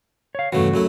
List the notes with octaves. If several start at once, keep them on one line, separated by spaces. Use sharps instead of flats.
C#5 F5
G2 C#3 E3 F#3 A3 F#4
F#2 F#3 A3 E4